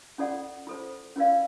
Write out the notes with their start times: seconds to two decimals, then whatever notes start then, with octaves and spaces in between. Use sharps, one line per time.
0.18 C#4 F4 A4 D5 F#5
0.67 F4 A4 C5
1.16 C#4 F4 A#4 D5 F5